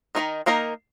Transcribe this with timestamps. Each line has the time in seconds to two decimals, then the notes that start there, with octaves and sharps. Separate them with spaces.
0.15 D#3 A#3 D#4 A#4 D#5
0.46 D#3 A#3 D#4 A#4 D#5